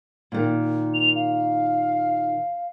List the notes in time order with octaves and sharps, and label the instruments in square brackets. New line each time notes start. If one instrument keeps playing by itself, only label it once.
[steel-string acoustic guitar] A#2 D#3
[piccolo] F7
F5